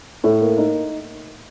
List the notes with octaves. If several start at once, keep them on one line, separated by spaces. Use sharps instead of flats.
A2
A#3
D#4